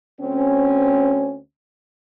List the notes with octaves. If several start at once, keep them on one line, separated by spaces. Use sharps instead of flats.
D2 C4 C#4